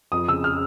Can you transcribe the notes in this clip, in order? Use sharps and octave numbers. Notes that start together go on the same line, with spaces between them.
F2 D#6
C#3 E6
F6